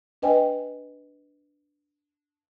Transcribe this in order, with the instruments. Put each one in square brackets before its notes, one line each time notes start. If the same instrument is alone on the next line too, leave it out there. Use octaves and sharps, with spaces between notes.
[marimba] D4 B4 D#5 G5 G#5